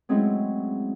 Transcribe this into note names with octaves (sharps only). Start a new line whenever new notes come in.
F#3 G#3 A3 C4 C#4 E4